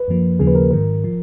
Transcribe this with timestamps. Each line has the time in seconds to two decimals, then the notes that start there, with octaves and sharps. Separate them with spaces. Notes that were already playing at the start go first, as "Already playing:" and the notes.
Already playing: B4
0.08 F#2 F3 A#3
0.39 D#2 C#3 F3 A#3 G#4
0.47 B4
0.55 A#4
0.71 G#2 D#3 F#3 A#4
1.04 F3